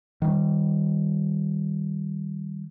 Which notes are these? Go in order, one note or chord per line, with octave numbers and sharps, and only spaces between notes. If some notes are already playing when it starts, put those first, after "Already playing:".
D#3 G3